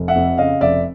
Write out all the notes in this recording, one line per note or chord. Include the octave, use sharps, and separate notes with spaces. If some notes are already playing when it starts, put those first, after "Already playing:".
Already playing: F1
E5 F#5
F2
C#3 D#5 F5
F1 D5 E5